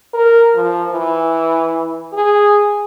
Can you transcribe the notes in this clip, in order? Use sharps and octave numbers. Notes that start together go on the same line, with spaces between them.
A#4
F3
E3
G#4